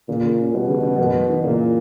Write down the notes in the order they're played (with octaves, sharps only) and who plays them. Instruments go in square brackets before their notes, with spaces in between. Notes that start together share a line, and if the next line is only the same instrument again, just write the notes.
[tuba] A#2 [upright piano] C#3
[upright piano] C#3
C#4
[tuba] B2 [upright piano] G3
[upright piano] C#3
C#3
[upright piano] F#2 [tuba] B2
[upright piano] F#2
E3
[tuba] A#2 [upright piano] C#3